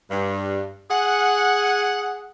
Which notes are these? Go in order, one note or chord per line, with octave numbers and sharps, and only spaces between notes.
G2
G#4 F#5